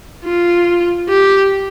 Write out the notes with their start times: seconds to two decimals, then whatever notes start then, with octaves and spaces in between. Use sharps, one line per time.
0.25 F4
1.09 G4